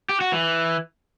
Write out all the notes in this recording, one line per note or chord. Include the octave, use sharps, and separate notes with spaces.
G4
F#4
E3